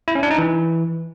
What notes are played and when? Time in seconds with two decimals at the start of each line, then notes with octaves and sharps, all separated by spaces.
0.08 E4
0.15 C#4
0.23 D4
0.31 D#4
0.38 E3